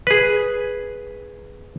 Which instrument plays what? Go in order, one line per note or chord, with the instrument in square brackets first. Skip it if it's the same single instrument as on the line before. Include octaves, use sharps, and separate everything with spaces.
[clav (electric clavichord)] G#4 B4